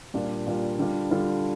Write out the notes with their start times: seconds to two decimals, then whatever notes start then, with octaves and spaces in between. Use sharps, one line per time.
0.14 A#2 G3 D4 F4
0.47 A#2 G3 D4 F4
0.79 D3 G3 D4 F4
1.11 D3 G3 D4 F4